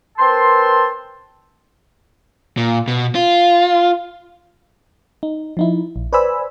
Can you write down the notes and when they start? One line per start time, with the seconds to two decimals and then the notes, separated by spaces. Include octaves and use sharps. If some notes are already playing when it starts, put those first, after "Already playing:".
0.18 C4 A#4 B4 A5 C6
2.57 A#2
2.88 B2
3.15 F4
5.23 D#4
5.57 F3 D#4 E4
5.96 A#1
6.13 B4 C5 D5 G#5 B5 E6